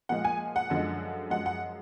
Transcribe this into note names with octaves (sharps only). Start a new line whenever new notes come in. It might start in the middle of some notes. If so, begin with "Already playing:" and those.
A#2 F3 G#3 F#5
G#5
F#5
F#2 D3 F3 G#3
F#2 F3 G#3 F#5
F#5